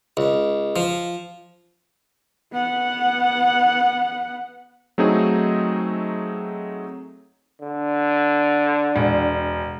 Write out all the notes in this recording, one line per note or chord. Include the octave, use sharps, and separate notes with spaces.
C#2
F3
B3 F#5
F#3 A3 C4 D#4 G#4
D3
E1